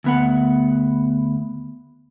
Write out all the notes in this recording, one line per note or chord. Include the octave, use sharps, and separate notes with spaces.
D2 B3 F#5